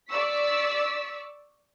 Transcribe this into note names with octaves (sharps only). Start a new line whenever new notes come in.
D5 C#6 E6 B6